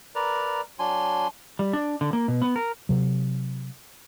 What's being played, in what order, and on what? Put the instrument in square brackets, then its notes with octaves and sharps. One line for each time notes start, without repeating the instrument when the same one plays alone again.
[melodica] A#4 B4 D5 A#5
F#3 D4 G#5 C6
[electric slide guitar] G3
D4
D3
A#3
B2
B3
A#4
[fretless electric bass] C3 F#3